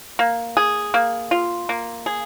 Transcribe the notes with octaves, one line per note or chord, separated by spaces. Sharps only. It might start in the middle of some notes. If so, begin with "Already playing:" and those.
A#3
G#4
A#3
F4
A#3
G#4